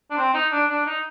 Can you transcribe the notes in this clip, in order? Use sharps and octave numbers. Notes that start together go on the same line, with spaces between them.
D4
C4
D#4
D4
D4
D#4